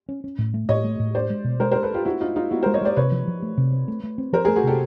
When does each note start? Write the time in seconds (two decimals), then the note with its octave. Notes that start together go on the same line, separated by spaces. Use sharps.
0.09 C#4
0.24 C#4
0.38 A2
0.54 A3
0.69 A2 C#5 D#5
0.84 A3
0.99 A2
1.14 D4 C5 D5
1.30 G#3
1.44 B2
1.60 G#3 A#4 C5
1.71 D4 A#4 C5
1.83 A4 B4
1.90 D4 F4 G4
2.05 D4 E4 F#4
2.21 D4 D#4 F4
2.36 D4 D#4 F4
2.51 B3 E4 F#4
2.63 G#3 A#4 C5
2.74 C#5 D#5
2.82 G#3 C5 D5
2.96 C3 B4 C#5
3.12 F3
3.28 F3
3.42 A3
3.58 C3
3.72 C4
3.88 A3
4.03 A3
4.18 C4
4.33 F3 A#4 C5
4.45 G#4 A#4
4.48 A3
4.56 F#4 G#4
4.64 C3 G4 A4